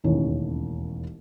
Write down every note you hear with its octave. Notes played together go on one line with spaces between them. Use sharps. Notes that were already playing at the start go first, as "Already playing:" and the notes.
E1 A1 D#2 C#4